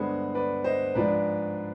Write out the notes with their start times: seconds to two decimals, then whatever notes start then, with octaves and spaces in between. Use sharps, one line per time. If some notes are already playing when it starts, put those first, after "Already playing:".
Already playing: G2 D3 G#3 B3 D4 G#4 C5
0.35 B4 D5
0.64 C5 D#5
0.95 G#2 F3 G#3 D4 B4 D5